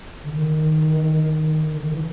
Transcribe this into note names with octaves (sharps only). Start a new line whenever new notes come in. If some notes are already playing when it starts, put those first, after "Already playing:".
D3
D#3
D#3
D3
D#3
E3